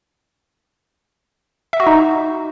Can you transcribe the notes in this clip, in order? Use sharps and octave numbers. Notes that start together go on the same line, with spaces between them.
E5
F#4
D#4